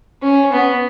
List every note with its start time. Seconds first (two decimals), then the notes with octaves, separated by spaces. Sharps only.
0.23 C#4
0.53 B3